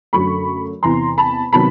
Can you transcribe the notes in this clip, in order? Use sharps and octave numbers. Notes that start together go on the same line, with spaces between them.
F#2 D3 F#3 A3 B5 C#6
E2 C3 E3 A#5 C6
A5 B5
C3 D#3 F#3 B3 A5 B5